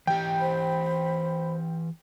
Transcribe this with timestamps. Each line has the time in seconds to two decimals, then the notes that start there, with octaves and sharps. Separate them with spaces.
0.07 E3 G4 G5
0.37 C5 B5